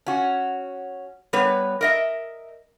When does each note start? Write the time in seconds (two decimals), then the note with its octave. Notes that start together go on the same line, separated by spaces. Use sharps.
0.06 C#4 F#4
1.33 G3 B3 B4 C#5
1.81 A#4 D#5 E5